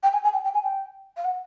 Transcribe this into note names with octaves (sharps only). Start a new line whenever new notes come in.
G5
G#5
G#5
G5
G5
G#5
G5
F5
F#5